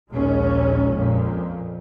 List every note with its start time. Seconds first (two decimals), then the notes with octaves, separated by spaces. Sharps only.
0.11 A#1 D#2 A#2 G#3 C#4
0.95 F2 A#2